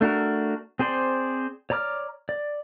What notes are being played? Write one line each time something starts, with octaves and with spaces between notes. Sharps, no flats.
A3 D4 F#4 A#4
C4 G#4 C5 D5 C6
C#5 D5 A#5 D6 F6
D5